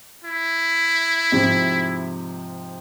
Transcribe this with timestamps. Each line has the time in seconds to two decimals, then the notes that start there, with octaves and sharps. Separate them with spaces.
0.24 E4
1.32 G#2 C3 F3